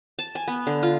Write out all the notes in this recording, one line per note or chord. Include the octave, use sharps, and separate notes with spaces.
A5
G#5
B3
D3
F4